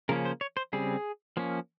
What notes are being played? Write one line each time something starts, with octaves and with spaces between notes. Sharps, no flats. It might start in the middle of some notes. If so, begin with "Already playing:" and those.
C#3 F3 A#3 C#4 A#4
C5
C#5
C5
C#3 G3 C4 G#4
F3 A#3 C#4